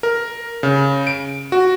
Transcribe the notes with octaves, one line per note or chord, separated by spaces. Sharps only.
A#4
C#3
D7
F#4